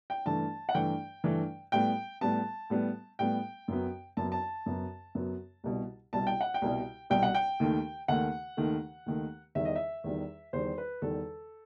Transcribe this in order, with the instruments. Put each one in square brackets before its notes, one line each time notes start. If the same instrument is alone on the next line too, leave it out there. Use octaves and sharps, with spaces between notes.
[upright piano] G5
G2 E3 A3 A5
F#5
G2 E3 A3 G5
G2 E3 A3
A2 G3 B3 G5
A2 G3 B3 A5
A2 G3 B3
A2 G3 B3 G5
F#2 F#3 B3
F#2 F#3 B3 A5
A5
F#2 F#3 B3
F#2 F#3 B3
C2 B2 G3
C2 B2 G3 A5
G5
F#5
G5
C2 B2 G3
C2 B2 G3 G5
F#5
G5
D#2 D#3 A3
D#2 D#3 A3 F#5
D#2 D#3 A3
D#2 D#3 A3
E2 D#3 G3 E5
D#5
E5
E2 D#3 G3
E2 D#3 G3 C5
B4
E2 D#3 G3 A4